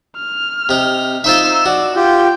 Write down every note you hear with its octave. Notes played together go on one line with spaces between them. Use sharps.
F6
C3 D#4
D#4 F4 C5 E5 E6
F#4 D5
F4 G4 G5